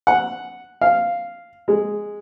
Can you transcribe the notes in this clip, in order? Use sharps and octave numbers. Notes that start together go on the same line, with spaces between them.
F#5
F5
G#3